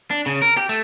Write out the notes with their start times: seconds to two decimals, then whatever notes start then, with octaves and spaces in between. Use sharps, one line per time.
0.11 D4
0.26 C#3
0.42 A#4
0.57 G4
0.69 A3